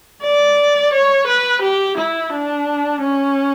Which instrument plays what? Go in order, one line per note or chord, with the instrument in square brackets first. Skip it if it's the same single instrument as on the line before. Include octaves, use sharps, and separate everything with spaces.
[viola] D5
C#5
B4
G4
E4
D4
C#4